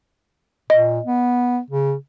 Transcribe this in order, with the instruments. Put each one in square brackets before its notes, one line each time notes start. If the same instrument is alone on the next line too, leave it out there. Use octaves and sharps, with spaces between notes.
[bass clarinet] A#2 [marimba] D#5
[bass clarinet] B3
C#3